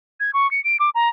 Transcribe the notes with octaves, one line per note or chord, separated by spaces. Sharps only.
G#6
C#6
C#7
D7
D6
A#5